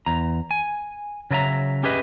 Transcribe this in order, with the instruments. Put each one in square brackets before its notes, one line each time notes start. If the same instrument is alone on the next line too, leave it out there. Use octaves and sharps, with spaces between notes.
[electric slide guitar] E2 A#5
G#5
C#3 F#3 A#4 D#5 E5 A#5
C#4 G4 G#4 B4 D#5 E5